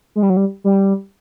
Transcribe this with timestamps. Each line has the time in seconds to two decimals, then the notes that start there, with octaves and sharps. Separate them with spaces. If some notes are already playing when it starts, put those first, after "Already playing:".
0.16 G#3
0.23 G3
0.30 F#3
0.37 G3
0.64 G3